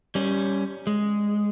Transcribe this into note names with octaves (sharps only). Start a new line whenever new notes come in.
G3 C#4
G#3